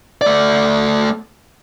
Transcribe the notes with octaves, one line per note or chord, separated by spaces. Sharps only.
A3 D5